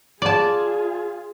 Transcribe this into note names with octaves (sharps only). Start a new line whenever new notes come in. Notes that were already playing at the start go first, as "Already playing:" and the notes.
F4 G#4 D5 A5